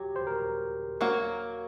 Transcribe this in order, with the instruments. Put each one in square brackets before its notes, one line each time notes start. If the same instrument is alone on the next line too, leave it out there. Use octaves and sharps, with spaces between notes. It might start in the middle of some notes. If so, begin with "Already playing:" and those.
Already playing: [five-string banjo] F#3 F#4 [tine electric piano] G4
[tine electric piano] C5
A#4
[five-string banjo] F#3 A#3 F#4 [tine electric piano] A#4